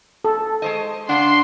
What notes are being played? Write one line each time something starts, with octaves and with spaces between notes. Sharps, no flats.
A4
G#3 C5 D#5
C#3 D4 F#5 C6